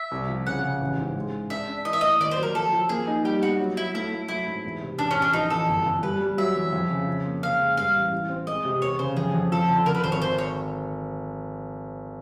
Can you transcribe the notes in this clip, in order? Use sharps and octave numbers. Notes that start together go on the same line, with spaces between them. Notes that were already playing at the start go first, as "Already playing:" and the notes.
Already playing: E5
C2
F3
C#3 F#5
C#3
A1
G#2
G#3
G#3
D4 E5
D4
E3 D#5
E5
A2 D#5
D#2 D5
C5
F#3
A#4
F3 A4
F3
A#3 G#4
D#4
G3 G4
B3 F#4
F#3
F#3 E4
A3 E4
A3
F#3 E4
G#2
E1
C3
A1 D4
C#4
A1
D4
F3 D#4
E2 A4
G1
G1
G3 B4
G3
F#3 E5
E2
F2
C#3
F3
A#3
C#3 F5
G#3
G2 F5
A1
E3
C4
G#3 D#5
C3
E1 C#5
C#3 C5
F2 G#4
F2
F3 A4
D3
D3 A#4
B4
G#1 C5
C#5
D3 C5
C#5